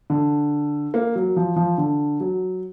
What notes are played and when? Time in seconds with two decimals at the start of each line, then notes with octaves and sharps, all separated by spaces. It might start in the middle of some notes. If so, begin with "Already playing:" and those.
0.10 D3
0.94 A#3
1.15 F#3
1.36 F3
1.56 F3
1.78 D3
2.20 F#3